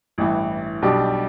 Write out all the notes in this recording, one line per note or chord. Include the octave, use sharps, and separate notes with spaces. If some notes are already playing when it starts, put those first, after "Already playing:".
A1 G2 E3
B1 B2 G3 D4 G4